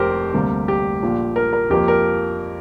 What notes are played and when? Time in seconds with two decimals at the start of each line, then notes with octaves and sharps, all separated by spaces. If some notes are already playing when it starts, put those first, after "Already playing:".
Already playing: F1 F2 C3 G4 A#4 C5
0.34 D2 C3 G3 A#3
0.68 G4
1.03 A#1 A#2 F3
1.36 A#4
1.53 A#4
1.70 F2 F3 A#3 G4
1.88 A#4